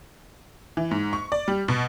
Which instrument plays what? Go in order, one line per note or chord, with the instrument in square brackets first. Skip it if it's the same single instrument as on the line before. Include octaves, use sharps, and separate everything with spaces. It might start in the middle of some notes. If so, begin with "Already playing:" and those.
[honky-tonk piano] E3
G#2
C#6
D5
G3
B2